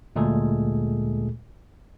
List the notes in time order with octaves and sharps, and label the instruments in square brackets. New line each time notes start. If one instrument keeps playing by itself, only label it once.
[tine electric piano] D2 A#2 G#3 A3 G#4 A4